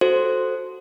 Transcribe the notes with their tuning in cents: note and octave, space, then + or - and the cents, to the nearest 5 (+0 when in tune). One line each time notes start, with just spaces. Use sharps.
F#4 +0 A4 +0 C5 +0